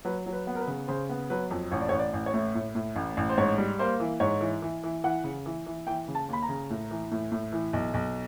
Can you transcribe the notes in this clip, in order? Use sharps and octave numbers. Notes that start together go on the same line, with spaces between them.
F#3 B4
F#3
B4
B3
A#4
B4
C#3
C#3 C5
B3
F#3 B4
F2
A1 C#5
D5
C#5
A1
D5
A1
C#5
A2
A2
A2
A1
A1
C5
G#2 C#5
G3
A#3 C5
E3
G#2 C#5
E3
E3
E3
E3 F#5
C#3
E3
E3
E3 G5
C#3
A5
D#2 B5
A#5
C#3
A2
E3
A2
A2
E3
B1
B1